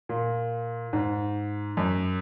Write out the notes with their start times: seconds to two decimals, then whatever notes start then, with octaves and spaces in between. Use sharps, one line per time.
0.09 A#2
0.93 G#2
1.77 F#2